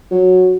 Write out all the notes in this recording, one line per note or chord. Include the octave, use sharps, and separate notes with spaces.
F#3